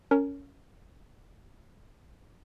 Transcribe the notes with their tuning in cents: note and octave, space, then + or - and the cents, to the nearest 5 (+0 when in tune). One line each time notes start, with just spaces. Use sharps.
C#4 +15 A#4 -20